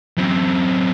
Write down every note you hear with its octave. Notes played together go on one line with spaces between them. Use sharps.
F#2 C4